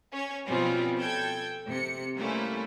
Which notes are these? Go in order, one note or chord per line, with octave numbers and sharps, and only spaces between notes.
C#4 C#5
B2 F3 G3 C4 C#4 F4
A4 G5 G6 G#6
C3 C#7
G3 A3 A#3 C4 C#4 E4